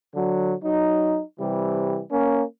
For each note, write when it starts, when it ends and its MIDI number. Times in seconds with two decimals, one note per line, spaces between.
0.15 0.54 50
0.15 0.54 54
0.63 1.21 54
0.63 1.21 63
1.40 2.02 48
1.40 2.02 52
1.40 2.02 55
2.12 2.44 58
2.12 2.44 61